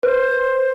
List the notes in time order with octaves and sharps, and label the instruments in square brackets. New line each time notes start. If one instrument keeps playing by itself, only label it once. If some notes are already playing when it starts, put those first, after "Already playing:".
[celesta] B4 [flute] C5